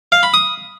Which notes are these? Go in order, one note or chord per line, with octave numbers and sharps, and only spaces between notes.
F5
B5
D#6